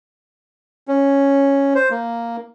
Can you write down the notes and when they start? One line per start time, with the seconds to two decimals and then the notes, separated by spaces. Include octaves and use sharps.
0.88 C#4
1.75 C5
1.91 A#3